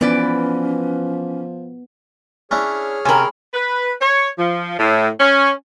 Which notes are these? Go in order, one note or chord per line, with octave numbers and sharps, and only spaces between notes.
E3 F3 B3 C#4 B4 D5
C#4 D4 E4 G#4 C#5 F6
C3 C#4 A#4 G5 G#5 B5
B4
C#5
F3
A2
C#4